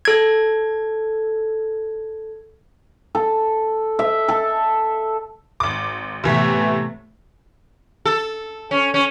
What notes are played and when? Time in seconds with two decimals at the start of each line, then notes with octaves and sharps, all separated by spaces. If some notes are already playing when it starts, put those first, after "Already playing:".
0.05 A4 G#6
3.15 A4
3.99 E5
4.28 A4
5.60 G#1 D6
6.24 A2 C3 E3 A3 B3 B6
8.05 A4
8.71 C#4
8.94 C#4